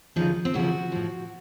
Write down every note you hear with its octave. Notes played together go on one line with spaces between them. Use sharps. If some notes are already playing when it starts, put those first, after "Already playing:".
D2 C#3 F3 D#4
C4
D2 C#3 F3 F#4
A2 F3